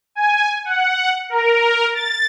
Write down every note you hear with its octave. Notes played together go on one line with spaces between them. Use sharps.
G#5
F#5
A#4
A6